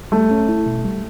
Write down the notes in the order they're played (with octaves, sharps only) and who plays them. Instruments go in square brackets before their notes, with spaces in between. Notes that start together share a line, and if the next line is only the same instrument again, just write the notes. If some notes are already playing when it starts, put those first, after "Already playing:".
[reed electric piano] G3 [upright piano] A3
[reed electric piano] C#4
E4
B2
G3